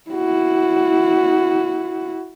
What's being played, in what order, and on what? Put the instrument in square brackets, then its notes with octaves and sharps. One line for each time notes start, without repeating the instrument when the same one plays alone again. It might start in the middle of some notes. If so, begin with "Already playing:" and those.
[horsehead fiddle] E4 F#4